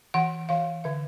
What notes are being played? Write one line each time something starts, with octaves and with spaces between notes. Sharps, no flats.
E3 F#5
E3 F5
D3 E5